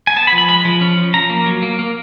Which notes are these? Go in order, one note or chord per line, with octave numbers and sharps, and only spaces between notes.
G#5
B3 A5
B5
F3
B5
G#3 B5
F3
C#4
F3
F3 A#5
A#3
F#3
A#3
A#3